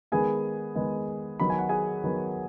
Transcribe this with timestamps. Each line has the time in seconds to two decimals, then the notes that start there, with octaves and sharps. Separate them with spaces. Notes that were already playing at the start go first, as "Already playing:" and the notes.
0.12 D#3 G#3 B3 G#4 G#5
0.75 D#3 G#3 B3
1.40 D#3 F#3 B3 B5
1.50 G#5
1.59 F#5
1.69 G#4 G#5
2.03 D#3 F#3 B3